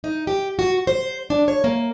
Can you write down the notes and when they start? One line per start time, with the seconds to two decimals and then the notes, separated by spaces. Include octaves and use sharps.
0.04 D#4
0.27 G4
0.59 F#4
0.87 C5
1.30 D4
1.48 C#5
1.64 A#3